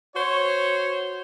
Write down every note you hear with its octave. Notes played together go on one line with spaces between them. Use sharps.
F#4 C5 C#5